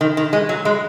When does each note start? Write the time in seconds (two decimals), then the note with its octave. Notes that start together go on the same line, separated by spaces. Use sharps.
0.01 D#3
0.17 D#3
0.33 G#3
0.49 F#3
0.65 G#3